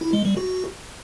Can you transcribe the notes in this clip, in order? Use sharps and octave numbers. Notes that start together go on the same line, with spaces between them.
E4
G#3
G3
F#4